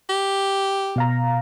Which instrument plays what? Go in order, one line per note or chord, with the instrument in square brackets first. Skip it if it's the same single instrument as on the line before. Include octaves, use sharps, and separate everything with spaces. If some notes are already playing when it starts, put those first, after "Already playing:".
[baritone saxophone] G4
[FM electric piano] B2 F5 A#5